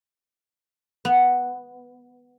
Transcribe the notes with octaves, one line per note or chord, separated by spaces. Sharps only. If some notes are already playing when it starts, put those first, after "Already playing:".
B3